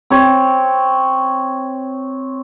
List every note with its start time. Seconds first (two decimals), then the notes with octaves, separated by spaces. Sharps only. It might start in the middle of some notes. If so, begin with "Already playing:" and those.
0.10 C4 C#5